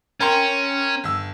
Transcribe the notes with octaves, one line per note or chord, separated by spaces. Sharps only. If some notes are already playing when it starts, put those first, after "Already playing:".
C#4 A#4 G5 C6
G1 E6